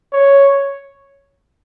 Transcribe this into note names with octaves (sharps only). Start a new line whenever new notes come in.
C#5